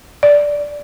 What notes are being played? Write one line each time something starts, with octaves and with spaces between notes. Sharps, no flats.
D5